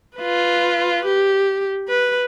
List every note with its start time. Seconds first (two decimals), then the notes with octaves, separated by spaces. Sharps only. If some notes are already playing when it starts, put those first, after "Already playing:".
0.18 F4 B4
1.05 G4
1.88 B4